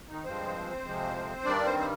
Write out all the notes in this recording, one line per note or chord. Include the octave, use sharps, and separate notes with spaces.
D#3 D#4
G2 F3 G#3 C4 C5
F2 C3 F3 G#3
G2 D#3 G3 D4 D5
C4 C5
C5